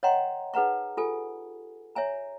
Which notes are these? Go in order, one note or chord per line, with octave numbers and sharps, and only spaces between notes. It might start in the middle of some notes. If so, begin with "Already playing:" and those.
C#5 D#5 F#5 G5 A#5 C6
D#4 G#4 B4 F#5 A#5 C#6
F4 G4 A4 G#5
C#5 E5 G#5 A#5